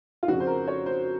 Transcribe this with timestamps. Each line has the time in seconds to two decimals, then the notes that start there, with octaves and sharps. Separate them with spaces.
0.23 F4
0.27 F2 C#3 F3 F#4
0.40 C5
0.47 A#4
0.68 C#5
0.86 C5